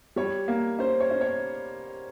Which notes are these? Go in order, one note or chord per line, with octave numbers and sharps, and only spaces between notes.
G3 C#5
A#3
C#4 C5
C#5
C#4
C#5